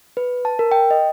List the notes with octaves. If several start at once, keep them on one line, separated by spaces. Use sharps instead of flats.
B4
A5
A#4
G5
D#5